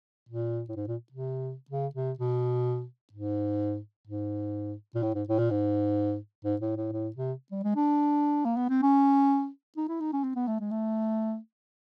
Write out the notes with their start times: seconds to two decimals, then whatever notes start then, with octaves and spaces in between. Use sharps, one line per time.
0.29 A#2
0.69 A2
0.76 G#2
0.88 A#2
1.12 C3
1.70 C#3
1.95 C3
2.19 B2
3.13 G#2
4.08 G#2
4.95 A#2
5.03 A2
5.15 G#2
5.29 A2
5.39 A#2
5.50 G#2
6.45 G#2
6.61 A2
6.77 A2
6.92 A2
7.16 C3
7.51 G3
7.64 G#3
7.76 D4
8.45 A#3
8.57 B3
8.70 C4
8.82 C#4
9.77 D#4
9.89 E4
10.00 D#4
10.13 C#4
10.24 C4
10.36 B3
10.47 A3
10.60 G#3
10.71 A3